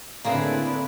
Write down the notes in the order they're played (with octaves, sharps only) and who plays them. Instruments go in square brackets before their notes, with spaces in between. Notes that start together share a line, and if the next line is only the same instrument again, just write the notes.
[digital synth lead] A2 [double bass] D3 [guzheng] A#3 C4 G#4 [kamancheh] D4 B4